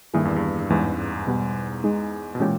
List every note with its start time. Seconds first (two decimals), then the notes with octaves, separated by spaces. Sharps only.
0.14 G2 D#3 G3 A#3 E4 G#4
0.25 E2
0.36 G2
0.60 G2
0.70 E2 G#2 E3 G#3 C#4
1.27 B2 G3 B3
1.84 G#3 D#4 G#4
2.35 B2
2.40 A#2 E3 G#3 C#4 G4